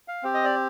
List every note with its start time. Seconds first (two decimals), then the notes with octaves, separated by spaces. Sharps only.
0.08 F5
0.23 C4 G4
0.34 D#5
0.44 D5